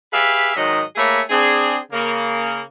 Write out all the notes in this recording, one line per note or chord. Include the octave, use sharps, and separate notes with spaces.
G4 G#4 B4 E5 F5
G#2 D#3 F#3 D#5
A3 A#3 G#4 C#5 B5
C4 D4 G#4
C#3 A#3